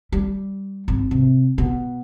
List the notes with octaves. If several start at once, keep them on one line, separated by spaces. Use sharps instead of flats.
G3
G#1
C3
B2